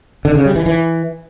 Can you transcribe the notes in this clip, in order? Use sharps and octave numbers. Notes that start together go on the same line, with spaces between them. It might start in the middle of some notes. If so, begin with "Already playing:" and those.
D3
C#3
G3
E3
E3